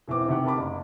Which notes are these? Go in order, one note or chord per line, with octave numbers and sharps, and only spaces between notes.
E1 E3 C4 D6
C3 D#3 G4 F#5 D6
A#4 A5 B5 D6
F#1